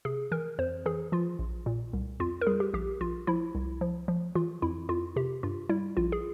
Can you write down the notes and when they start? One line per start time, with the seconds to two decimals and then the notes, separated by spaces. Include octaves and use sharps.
0.05 C3 G#4
0.32 E3 A#4
0.58 F2 C5
0.86 E3 G#4
1.12 F3 F4
1.39 A#1
1.66 A#2
1.93 C2
2.20 F2 F4
2.41 A#4
2.47 G3 G#4
2.60 G4
2.74 A#1 G4
3.01 A#1 F4
3.27 F3 E4
3.55 C2
3.81 F3
4.08 F3
4.35 E3 F4
4.62 F2 E4
4.89 F2 F4
5.16 C3 G4
5.43 G2 F4
5.69 G3 E4
5.97 A#1 F4
6.12 G#4